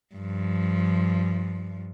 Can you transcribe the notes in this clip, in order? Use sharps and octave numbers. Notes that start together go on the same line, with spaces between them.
G2 F3